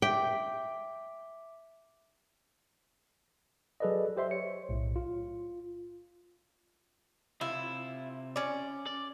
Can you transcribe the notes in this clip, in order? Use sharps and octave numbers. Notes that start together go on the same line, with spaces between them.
E5 G5 D6 B6
F#3 G#4 A4 B4 D5 D#5
G4 C5 E5 C6
C#5 C#7
B1 A2
F4
C3 E4 F4
C#4 D5
D5